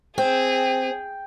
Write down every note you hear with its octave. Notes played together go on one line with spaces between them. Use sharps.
C4 G#4 G5